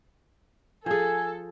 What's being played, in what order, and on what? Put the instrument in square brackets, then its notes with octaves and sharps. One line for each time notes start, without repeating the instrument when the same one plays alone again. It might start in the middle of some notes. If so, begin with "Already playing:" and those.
[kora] F3 G#4 [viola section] A4 [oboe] G#5